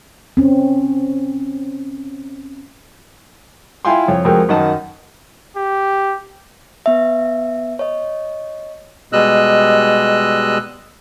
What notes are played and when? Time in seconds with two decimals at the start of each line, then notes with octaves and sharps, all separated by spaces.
0.37 C4 C#4
3.85 E4 F4 F5 G5 G#5 C6
4.08 F2 C#5
4.25 F2 G#3 F#4 A#4 G5
4.49 F#2 D#3 D#5 F#5 A5
5.57 G4
6.86 B3 E5
7.79 C#5 D#5
9.13 B2 G3 G#3 D#5 E6 F#6